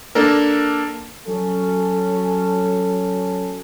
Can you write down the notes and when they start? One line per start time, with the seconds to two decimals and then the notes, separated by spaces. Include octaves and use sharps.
0.15 A#3 D4 A4 A#4
1.27 F#3 C#4 A4